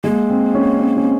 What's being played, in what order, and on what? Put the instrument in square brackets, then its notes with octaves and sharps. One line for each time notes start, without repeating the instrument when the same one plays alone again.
[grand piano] G#3 [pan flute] A#3
[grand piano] C4
C#4
C#4
C#4
C4